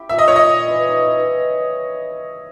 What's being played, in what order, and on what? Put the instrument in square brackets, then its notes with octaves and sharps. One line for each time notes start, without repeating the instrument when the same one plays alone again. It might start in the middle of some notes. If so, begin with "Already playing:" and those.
Already playing: [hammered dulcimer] E4 G4
[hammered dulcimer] A#2 [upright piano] E5
[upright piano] D#5
[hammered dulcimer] A#2 [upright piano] C#5
[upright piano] D#5
[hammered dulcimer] A#2
E3
D#4
E3